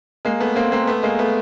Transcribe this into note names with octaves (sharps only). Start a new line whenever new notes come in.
G#3 A#3
A3 B3
A#3 C4
A#3 C4
A3 B3
G#3 A#3
A3 B3